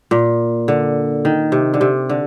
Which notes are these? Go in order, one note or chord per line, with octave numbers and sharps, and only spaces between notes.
A#2
D3
D#3
C3
D3
C3
D3